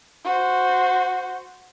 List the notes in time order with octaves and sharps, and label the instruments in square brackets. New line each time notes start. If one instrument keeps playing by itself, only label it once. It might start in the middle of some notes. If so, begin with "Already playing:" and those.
[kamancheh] F#4 C5